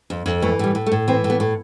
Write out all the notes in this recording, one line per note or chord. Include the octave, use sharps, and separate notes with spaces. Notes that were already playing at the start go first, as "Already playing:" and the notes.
F2
F2
E3 A3
A2 G3
A2
A3
A2
E3 C4
A2
B3
A2